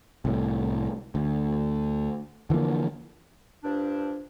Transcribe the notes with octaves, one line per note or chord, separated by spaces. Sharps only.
C2 A2
D2
D3 E3 F3 A#3
G2 F3 D4